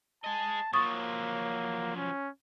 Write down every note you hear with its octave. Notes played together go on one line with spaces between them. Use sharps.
G#4 D#5 A5
F3 F#3 A#3 C#6 D#6 A6
C#4